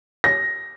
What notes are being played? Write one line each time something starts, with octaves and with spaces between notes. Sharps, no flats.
A#6